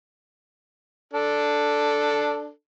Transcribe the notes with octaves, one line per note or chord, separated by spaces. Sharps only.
D4 A4